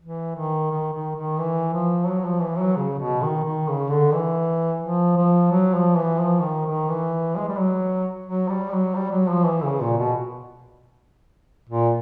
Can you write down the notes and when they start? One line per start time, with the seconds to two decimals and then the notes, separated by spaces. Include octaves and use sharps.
0.02 E3
0.36 D#3
0.71 D#3
0.93 D#3
1.16 D#3
1.39 E3
1.73 F3
2.08 F#3
2.25 F3
2.42 E3
2.59 F#3
2.76 C#3
2.99 B2
3.22 D#3
3.45 D#3
3.68 C#3
3.91 D3
4.14 E3
4.82 F3
5.17 F3
5.52 F#3
5.74 F3
5.97 E3
6.20 F3
6.42 D#3
6.66 D#3
6.89 E3
7.38 G#3
7.48 G3
7.57 F#3
8.26 F#3
8.49 G3
8.72 F#3
8.95 G3
9.12 F#3
9.30 F3
9.46 E3
9.63 C#3
9.81 A#2
9.98 B2
11.70 A#2